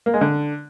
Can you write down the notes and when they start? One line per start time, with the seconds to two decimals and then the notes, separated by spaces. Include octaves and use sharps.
0.06 A#3
0.14 G#3
0.21 D3